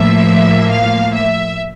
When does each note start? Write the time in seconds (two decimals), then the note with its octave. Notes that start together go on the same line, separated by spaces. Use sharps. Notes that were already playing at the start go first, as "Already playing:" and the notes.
Already playing: A2 F3 A#3 E5
0.70 F5
1.13 E5